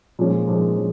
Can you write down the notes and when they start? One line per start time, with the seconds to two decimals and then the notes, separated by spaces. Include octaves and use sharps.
0.19 A#2 F3 G#3 C#4
0.48 A#2 F3 G#3 C#4
0.77 F3 C#4